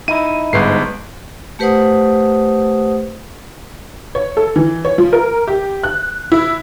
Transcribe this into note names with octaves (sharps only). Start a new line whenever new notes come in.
D#4 E4 D#7
G1 G#2 B4 C7
A3 G4 B4 C5 F#5 D#6
C#5
A4
E3
C#5
F3
A#4
G4
F#6
E4